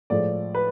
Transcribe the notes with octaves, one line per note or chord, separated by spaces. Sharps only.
A2 F3 G#3 D5
B4